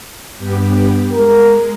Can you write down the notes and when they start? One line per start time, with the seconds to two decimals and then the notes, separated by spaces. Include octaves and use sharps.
0.38 G2 B3 G4
1.13 G#3 A#4